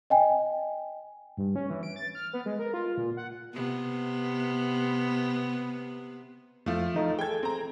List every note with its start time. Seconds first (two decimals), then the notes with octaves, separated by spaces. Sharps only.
0.10 D#5 G5 G#5
1.37 G2
1.56 C#4
1.70 E3
1.83 D7
1.96 A6
2.15 F6
2.33 B3
2.46 G#3
2.59 A#4
2.74 F4
2.97 A#2
3.17 F#5
3.53 C3 B3
6.66 F2 F3 A3
6.95 E3 D#4 A4
7.19 G#4 A4 G5 G#6
7.43 C4 A#5